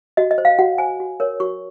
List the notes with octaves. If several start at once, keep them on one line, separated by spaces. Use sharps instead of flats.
F#4 D#5
D#5
C5
F5
F#4 F#5
C5 G#5
F#4
A#4 C#5
F#4 C#6